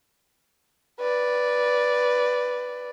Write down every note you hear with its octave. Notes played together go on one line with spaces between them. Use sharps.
B4 D5